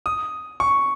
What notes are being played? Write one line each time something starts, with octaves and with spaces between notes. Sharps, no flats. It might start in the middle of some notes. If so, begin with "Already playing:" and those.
D#6
C#6